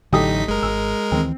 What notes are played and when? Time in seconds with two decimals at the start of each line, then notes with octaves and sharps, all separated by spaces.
0.13 A1 D3 F#3 A3 D#4 G4 D#6 B6
0.48 F#1 G#3 A#4
0.63 G#1 E6
1.12 D2 D#3 E3 C4